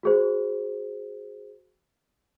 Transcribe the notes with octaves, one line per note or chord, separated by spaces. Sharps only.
F#4 G#4 C5